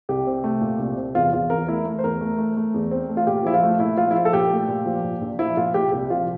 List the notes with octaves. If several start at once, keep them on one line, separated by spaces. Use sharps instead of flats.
C2 G4
C4
A3
A#2
C2
C4
E2 F4
E2 F4
E2 A#4
A3 E4
A3
C5
E2 A#4
A3
A3
A3
E2
C4
A3
F4
A#2 G4
F3 E4
F4
A3
A#2 E4
F3 F4
E4
F3 F4
A4
A#2 G4
A3
A#2
F3
A#2
A#1
F3 E4
A#2 F4
A#2 G4
C2 G4
F3 F4